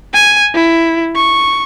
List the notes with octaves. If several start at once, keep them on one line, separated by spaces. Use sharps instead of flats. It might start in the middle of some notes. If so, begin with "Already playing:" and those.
G#5
E4
C#6